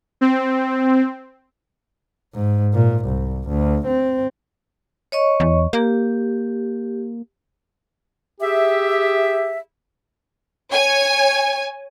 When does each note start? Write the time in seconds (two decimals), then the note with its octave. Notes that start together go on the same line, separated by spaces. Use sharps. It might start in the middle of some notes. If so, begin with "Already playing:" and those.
0.21 C4
2.35 G#2
2.74 A#2
3.05 C2
3.48 D2
3.87 C4
5.12 C#5 D#5 C#6
5.40 E2
5.73 A#3 G4
8.41 G4 G#4 E5
10.72 C#5 G#5